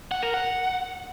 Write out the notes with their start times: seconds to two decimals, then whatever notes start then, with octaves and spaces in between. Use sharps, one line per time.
0.11 F#5
0.23 A#4
0.34 F#5